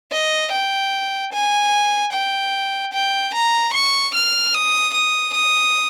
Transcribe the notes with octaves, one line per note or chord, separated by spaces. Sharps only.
D#5
G5
G#5
G5
G5
A#5
C#6
F6
D#6
D#6
D#6